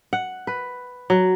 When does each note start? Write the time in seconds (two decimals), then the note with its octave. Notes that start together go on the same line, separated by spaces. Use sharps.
0.13 F#5
0.47 B4
1.10 F#3